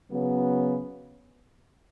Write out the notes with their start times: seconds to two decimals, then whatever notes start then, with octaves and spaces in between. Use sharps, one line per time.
0.11 C#3 F#3 B3